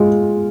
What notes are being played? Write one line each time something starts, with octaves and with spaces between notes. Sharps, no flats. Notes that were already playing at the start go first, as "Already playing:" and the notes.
Already playing: G#3 F4